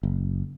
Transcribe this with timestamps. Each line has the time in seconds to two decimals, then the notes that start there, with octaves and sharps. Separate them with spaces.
0.03 F#1